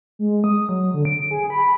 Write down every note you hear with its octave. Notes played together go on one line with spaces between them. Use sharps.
G#3
D#6
F#3
D3
D7
G#4
B5